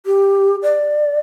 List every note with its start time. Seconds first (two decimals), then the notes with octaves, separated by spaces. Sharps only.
0.06 G4
0.63 D5